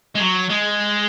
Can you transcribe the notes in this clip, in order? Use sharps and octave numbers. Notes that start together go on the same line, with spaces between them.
G#3
F#3
G#3